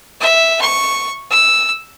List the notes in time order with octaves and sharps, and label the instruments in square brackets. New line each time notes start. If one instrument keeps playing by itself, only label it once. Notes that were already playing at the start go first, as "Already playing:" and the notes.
[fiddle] E5
C#6
E6